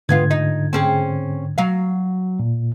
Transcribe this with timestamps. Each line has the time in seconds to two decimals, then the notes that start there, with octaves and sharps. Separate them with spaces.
0.09 E2 G#2 D3 B3 F4 G#6
0.31 D#4
0.73 C4 C#4 G#4
1.58 F#3 F5
2.40 A#2